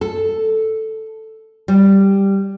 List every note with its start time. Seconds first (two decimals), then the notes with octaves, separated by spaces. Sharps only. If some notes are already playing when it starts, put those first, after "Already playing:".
0.01 A4
1.68 G3